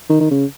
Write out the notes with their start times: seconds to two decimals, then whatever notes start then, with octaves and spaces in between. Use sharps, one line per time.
0.10 D#3
0.21 D#3
0.31 C#3